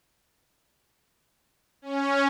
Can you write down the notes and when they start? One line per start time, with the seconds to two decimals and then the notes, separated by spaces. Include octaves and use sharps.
1.82 C#4